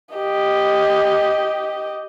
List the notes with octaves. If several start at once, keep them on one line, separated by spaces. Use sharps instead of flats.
G4 D#5